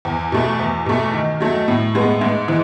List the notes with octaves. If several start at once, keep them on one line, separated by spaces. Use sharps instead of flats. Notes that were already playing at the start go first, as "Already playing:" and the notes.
E2
B2 A3
E2
B2 A3
D#3
F#3 A3
A2
G#3 B3
G#2
E3